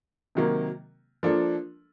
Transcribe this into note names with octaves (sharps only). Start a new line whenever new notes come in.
C3 D#3 F#3 A#3
F3 A#3 D4 F4 A4